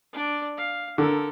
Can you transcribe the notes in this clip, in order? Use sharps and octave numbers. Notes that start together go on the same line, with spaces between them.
D4 D5
F5
D3 A4 A#4